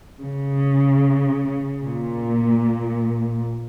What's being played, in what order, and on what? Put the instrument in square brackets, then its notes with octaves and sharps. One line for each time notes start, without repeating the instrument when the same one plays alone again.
[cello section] C#3
A#2